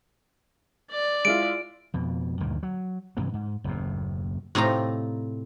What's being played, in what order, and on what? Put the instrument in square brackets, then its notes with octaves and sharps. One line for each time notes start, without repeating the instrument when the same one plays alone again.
[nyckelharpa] D5
[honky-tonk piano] G#3 E4 F4 [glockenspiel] D7
[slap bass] F2 B2
D2 G2 A#2 D#3
F#3
G2 C3 E3 F#3
G#2
F#1 D#2 A2
[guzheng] A2 C3 D#4 F4 A#5